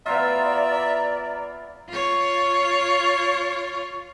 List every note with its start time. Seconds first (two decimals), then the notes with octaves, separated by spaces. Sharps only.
0.06 B3 E4 F4 D5 E5 A#5
1.89 F4 C#5